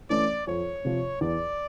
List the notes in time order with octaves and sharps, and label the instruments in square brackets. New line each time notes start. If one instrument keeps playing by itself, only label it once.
[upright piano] E3 A3 C#4 [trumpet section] D5
[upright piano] F2 [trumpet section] C#5
[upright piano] C3 F3
[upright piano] E2 [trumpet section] D5